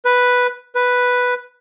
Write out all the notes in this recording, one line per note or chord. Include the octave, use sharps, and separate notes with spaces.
B4
B4